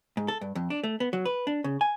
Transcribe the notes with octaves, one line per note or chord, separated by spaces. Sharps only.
G#2
A4
G2
F2
D4
A3
B3
F#3
B4
D4
C#3
G#5